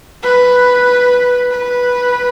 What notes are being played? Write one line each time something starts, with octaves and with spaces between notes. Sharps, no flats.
B4
B4